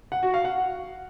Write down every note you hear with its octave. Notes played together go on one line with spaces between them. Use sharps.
F#5
F#4
F5
F#5